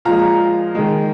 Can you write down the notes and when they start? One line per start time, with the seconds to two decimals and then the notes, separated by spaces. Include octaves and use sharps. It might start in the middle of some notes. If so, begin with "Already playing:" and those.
0.05 A#2 F3 G#3 F5 A#5
0.75 D#3 G#3